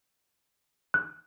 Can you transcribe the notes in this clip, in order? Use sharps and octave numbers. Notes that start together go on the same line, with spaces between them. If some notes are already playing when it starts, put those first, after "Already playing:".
F#6